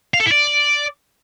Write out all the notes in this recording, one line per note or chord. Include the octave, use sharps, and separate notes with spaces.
F5
A4
E4
D5